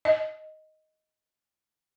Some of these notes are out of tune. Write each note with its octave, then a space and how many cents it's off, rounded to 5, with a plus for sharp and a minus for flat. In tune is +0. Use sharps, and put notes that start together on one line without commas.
D#5 +5